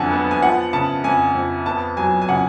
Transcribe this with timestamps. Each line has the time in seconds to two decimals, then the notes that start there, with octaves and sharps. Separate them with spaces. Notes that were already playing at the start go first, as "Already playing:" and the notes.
Already playing: F2 D3 F#3 F#5 G#5 A5
0.11 B3
0.31 G#5
0.42 F3 F#5
0.73 C#3 A5
1.04 F2 G#5
1.35 F2
1.66 B3 A5
1.97 F#3 G#5
2.22 G#5
2.29 C#3 F#5